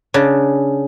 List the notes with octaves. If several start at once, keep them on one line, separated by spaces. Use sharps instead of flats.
C#3 D4